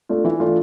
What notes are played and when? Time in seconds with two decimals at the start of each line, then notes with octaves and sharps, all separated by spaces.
0.09 A3 D4 F4
0.24 E3
0.40 A3 D4 F4